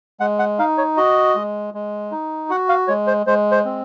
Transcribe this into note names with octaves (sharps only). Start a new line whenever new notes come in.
G#3 F#5
F#5
D#4 F5
C#5
F#4 D#5
G#3
G#3
D#4
F#4 F#5
F5
G#3 C#5
C5
G#3 C5
C5
C4